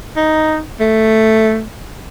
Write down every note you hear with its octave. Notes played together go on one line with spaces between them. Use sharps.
D#4
A3